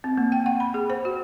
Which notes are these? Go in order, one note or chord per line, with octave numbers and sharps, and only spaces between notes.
C4
A#3
G5
F#5
B5
G#4
C5
F#4